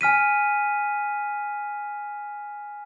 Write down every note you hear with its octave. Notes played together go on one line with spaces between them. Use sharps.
G#5 F6 B6 D#7